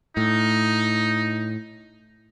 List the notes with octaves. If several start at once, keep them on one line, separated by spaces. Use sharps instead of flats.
A2 D#4